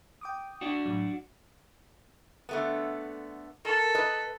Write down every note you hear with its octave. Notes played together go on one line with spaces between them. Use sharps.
G5 D6 D#6
D4 F#4
A2 F#3
D3 A3 B3
A4 A#4
B4 D#5